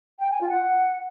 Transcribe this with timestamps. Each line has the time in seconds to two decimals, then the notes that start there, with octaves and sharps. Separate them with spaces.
0.20 G5
0.30 G#5
0.40 F4
0.50 F#5